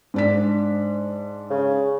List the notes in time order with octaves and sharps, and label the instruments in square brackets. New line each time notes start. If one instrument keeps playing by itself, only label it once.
[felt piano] G#2 D4 B6
[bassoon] C#3